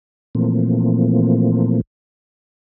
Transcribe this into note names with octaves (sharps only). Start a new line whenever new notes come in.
A#2 E3 F3 A3 A#3 C4